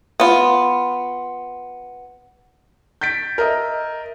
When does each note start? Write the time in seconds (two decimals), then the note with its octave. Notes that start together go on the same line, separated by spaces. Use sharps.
0.20 B3 F4
3.01 G6 A6 B6 D7
3.38 A#4 D#5 E5